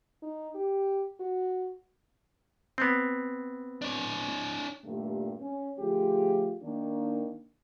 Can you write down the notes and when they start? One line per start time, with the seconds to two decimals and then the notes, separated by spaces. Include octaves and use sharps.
0.22 D#4
0.55 G4
1.20 F#4
2.78 B3 C4
3.82 D4 C#5
4.85 G2 A#2 D#3 G3 A3 A#3
5.40 C#4
5.79 D3 F3 A3 F4 G4 G#4
6.63 D#3 A#3 D4